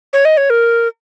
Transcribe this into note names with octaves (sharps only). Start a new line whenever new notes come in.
C#5
D#5
C#5
A#4